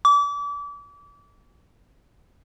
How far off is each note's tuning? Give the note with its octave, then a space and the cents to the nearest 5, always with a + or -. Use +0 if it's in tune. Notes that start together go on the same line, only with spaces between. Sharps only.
D6 -35